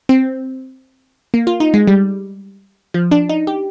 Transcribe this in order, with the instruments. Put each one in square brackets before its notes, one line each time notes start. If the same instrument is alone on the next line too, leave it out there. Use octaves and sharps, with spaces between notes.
[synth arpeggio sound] C4
A#3
F4
D#4
G#3
G3
F3
D4
D#4
G4